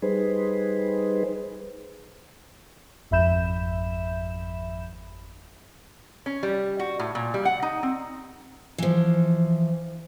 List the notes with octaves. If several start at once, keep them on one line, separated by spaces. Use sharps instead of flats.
G3 D#4 G#4 B4 C5
G#1 F2 E5 B5 G6 E7
C#4
G3
F#4
A2
A#2
G3
F#5
D#4
C4
E3 F3